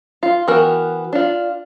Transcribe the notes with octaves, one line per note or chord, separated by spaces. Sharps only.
F4
E3 B3 F#4 A#4 G5
D4 F4